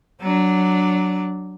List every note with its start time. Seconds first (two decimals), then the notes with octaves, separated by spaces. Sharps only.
0.21 F#3 D4